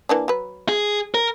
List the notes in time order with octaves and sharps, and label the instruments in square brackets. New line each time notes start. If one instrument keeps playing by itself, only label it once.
[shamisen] E3 A#3 D4
F#3 B4
[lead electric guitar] G#4
A#4